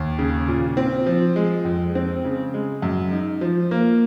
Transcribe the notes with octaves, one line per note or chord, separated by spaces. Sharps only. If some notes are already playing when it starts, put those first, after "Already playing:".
Already playing: D#2
C#3
A#2
C4
F3
G#3
F2
C4
C#3
G#3
F#2
D#4
F3
A#3